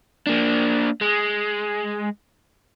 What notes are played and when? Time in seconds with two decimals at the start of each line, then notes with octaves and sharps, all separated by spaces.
0.27 A#3 D4
1.01 G#3